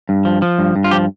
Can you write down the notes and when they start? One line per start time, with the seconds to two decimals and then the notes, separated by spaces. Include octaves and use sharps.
0.09 G2
0.25 F3
0.42 F3
0.59 G2
0.76 G2
0.84 F4
0.91 F3 G4